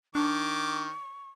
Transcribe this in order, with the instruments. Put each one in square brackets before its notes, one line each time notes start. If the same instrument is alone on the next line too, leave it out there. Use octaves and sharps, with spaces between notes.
[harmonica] D#3 D6 [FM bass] D4 [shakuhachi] C#6